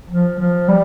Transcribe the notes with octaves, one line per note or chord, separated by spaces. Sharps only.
F3
F3
G3